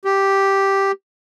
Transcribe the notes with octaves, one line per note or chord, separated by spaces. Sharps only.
G4